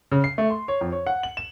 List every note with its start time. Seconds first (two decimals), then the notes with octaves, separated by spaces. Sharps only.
0.12 C#3
0.24 C7
0.38 A3
0.50 C6
0.68 C#5
0.81 F2
0.92 C#5
1.07 F#5
1.23 F#7
1.37 E7